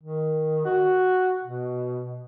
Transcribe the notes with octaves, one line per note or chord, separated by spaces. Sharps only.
D#3
F#4
B2